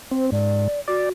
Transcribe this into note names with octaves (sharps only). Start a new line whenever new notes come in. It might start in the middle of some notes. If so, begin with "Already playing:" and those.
C4 C5
G#2 D5
F#4 D5